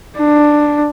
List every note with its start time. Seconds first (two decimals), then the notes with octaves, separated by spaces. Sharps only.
0.18 D4